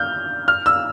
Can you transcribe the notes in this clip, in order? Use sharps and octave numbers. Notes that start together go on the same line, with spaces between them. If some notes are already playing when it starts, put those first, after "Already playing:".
Already playing: F6 G6
F6
E6